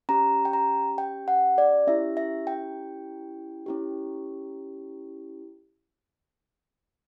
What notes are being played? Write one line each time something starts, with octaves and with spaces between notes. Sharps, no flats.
C#4 G4 A#5
G5
A#5
G5
F#5
D5
C#4 E4 G4 E5
E5
G5
C#4 E4 G4